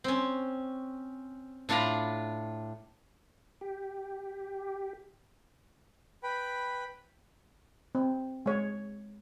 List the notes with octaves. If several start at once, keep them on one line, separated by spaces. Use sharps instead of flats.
C4 C#4
A2 D4 F4 F5 A#5 B5
G4
B4 G5 B5
C4
G#3 C#5